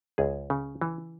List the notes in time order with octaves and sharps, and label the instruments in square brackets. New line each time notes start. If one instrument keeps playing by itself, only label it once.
[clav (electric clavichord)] C#2 G#4
C#3
E3